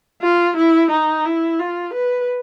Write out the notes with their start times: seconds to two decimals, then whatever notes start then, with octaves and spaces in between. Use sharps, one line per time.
0.22 F4
0.57 E4
0.91 D#4
1.25 E4
1.59 F4
1.94 B4